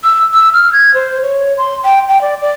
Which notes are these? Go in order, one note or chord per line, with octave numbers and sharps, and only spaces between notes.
E6
E6
F6
G#6
C5
C#5
C6
G5
G5
D5
D5